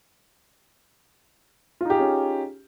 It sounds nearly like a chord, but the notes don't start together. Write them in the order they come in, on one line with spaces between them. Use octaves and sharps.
F4 D#4 G4 G#4 C#4